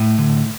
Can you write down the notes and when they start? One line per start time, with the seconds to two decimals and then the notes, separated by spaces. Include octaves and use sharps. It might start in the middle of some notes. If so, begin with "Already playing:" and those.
Already playing: A2
0.19 D3